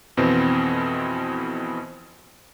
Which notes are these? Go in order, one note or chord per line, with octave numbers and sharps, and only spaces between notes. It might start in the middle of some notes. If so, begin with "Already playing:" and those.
F2 B2 E3 C4